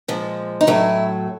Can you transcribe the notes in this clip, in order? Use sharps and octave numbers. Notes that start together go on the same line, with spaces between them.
A#2 F3 G#3
D#4
A2 F#3 A3 E4